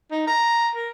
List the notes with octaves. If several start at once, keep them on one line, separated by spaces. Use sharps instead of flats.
D#4
A#5
A#4